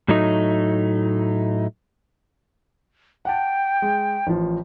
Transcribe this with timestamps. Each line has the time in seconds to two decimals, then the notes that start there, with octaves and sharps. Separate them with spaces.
0.08 A2 F#3 A3 D#4
3.25 F#5 G5 A5
3.82 G#3
4.27 A1 F3